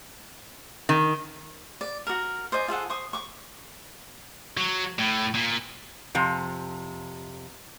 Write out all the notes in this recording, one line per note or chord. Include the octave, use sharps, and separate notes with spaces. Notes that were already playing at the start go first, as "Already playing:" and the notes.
D#3
D5
F#4 A#4
C5 D5 D#5 G#5
F4 G#4 A4 F#5
C5 C#6 D#6
C#6 D6
F#3
A2
A#2
F2 C3